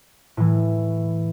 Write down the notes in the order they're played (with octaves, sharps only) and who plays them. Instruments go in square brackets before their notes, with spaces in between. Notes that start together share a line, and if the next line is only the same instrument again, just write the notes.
[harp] A2 E3